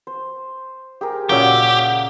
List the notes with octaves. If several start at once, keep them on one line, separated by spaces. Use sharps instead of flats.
C5
G4 G#4 A#4
A#2 C#3 A#3 F#4 G4 E5 F#5